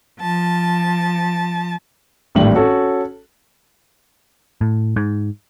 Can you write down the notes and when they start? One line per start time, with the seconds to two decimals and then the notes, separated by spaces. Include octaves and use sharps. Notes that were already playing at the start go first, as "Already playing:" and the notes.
0.19 F3 A5
2.35 G#1 A2 E3 G3 D4 F#7
2.55 C#4 F#4 A4
4.61 A2
4.96 G#2